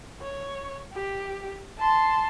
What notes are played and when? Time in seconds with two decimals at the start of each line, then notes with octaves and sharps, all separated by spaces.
0.21 C#5
0.93 G4
1.78 A5 C6